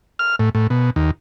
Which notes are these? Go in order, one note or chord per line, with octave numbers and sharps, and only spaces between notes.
F6
A2
A2
B2
D#2